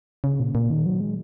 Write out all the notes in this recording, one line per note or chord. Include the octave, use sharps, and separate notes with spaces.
C#3
A#2
A#2
D#3
F#3
G#3